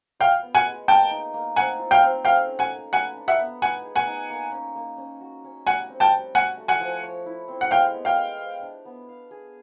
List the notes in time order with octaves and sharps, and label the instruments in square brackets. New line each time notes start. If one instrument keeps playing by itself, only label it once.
[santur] F4 [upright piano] F5 G5
[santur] B3
[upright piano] F#5 G#5
[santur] G#3
[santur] A#3 [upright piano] G5 A5
[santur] D#4
A#3
[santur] C4 [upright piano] F#5 G#5
[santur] F4
[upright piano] F5 G5
[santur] C4
[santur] A4 [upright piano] F5 G5
[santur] C#4
[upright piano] F#5 G#5
[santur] A#3
[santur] B4 [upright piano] F#5 G#5
[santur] D4
[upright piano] E5 F#5
[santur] B3
[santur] D#4 [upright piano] F#5 G#5
[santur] G#4
[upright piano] F#5 G#5
[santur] D#4
A#3
C#4
A#3
C#4
F#4
C#4
[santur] G3 [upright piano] F#5 G#5
[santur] C4
[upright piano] G5 A5
[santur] G3
[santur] F#4 [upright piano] F#5 G#5
[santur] A3
[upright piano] F#5 G#5
[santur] F3
C#5
E4
C4
[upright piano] F#5
[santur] G#3 [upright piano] F5 G5
[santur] B3
[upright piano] F5 G5
[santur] G#3
C5
D4
B3
F5
G#4